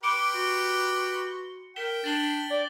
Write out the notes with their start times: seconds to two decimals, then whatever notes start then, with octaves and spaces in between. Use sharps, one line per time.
0.03 G4 B4 C6 D6 C#7
0.34 F#4
1.76 A#4 G5 B6 E7 G7
2.04 D4 A6 F#7 G7
2.51 D5